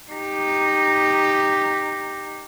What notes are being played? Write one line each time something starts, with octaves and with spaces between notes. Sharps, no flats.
D#4 G4